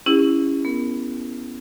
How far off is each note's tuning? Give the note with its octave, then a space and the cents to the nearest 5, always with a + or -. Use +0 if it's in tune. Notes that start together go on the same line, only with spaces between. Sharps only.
C#4 +0 E4 +0 G#4 -45
B3 +0 A#4 +0